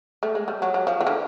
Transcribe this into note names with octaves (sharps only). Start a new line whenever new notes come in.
A3
G#3
G3
F#3
F#3
F3
E3
D3